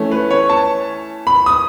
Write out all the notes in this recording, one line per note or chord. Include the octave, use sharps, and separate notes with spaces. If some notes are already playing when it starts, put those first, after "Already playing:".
Already playing: E3 A3 C#4
B4
C#5
A5
B5
D#6